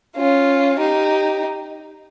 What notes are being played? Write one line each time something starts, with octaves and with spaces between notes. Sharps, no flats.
C#4 F4
D#4 G4